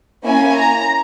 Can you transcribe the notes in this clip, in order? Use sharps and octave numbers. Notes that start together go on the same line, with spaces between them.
A#3 C#4 E4 G#5
A#5